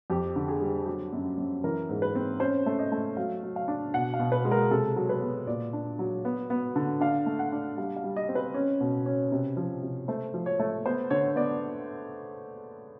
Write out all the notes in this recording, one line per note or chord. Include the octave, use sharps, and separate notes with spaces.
F2 G4
D3
G#4
G3
F#3 G4
F#2
F#2
E3 A#4
G#2
B4
C4
C#4 C5
A3
D#5
A3
F#3 F5
F#3
F5
D4
B2 F#5
F5
B2
B4
G#3
A#4
C3 A4
F#3
B4
B3
A#2 D5
D4
F#3
B3
B3
D3
D4 F5
A3
F#5
D4
G3 F5
F5
G3
D#5
C4
B4
C#4
B2
C#4
C3
F3
C3
A3 C5
F3
C#5
A3
B3 C5
D3 C#5
B3 D5